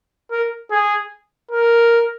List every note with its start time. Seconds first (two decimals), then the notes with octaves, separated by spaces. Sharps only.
0.31 A#4
0.71 G#4
1.51 A#4